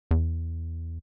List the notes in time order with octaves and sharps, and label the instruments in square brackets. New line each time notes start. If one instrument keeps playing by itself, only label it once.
[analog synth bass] E2